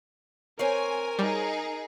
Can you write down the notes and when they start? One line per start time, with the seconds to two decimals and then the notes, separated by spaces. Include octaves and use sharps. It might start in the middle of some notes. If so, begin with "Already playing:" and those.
0.59 C4 A#4 C5 C#5 G#5
1.19 G3 D#4 G#4